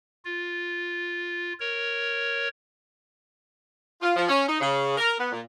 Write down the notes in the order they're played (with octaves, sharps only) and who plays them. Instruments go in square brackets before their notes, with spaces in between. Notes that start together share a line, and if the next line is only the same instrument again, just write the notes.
[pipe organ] F4
A#4 C#5
[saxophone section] F4
F3
C#4
D#4
C#3
A#4
B3
A#2